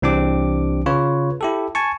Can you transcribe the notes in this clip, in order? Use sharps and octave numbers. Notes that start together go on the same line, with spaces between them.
C2 E3 C4 D4 G4 D6
C#3 F4 B4 C#5
E4 G4 A4
G#5 A5 C#6